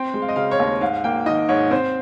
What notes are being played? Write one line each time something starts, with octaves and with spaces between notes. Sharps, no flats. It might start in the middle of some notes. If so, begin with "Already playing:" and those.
Already playing: C4 G5
G#3
F5
D#5
C#3 F5
C#5
D#2
G#2 F5
A#3 G5
D#3 D#5
G#2 C#5
C4 C5